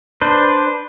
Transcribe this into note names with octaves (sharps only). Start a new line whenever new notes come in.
D4 B4 C5